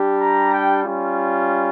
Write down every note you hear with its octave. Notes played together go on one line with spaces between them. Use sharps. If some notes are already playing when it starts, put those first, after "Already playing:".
Already playing: G3 D4 G4
A#5
G5
G3 C#4 F4